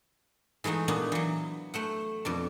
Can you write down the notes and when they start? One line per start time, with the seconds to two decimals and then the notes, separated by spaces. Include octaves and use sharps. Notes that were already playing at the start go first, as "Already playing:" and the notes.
0.64 E3 G#3 A3 D#4 F#4
0.88 A#2 B3 D4 D#4 F#4
1.12 E3 F#3
1.74 A3 C5 F#5
2.25 F2 B2 D4